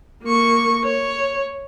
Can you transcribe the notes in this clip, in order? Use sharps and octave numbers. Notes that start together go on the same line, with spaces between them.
A#3 C#6
C#5